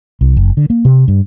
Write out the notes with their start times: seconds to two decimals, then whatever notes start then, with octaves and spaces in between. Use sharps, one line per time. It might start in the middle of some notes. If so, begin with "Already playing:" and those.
0.21 C2
0.37 F#1
0.57 D3
0.70 A#3
0.85 C3
1.08 G2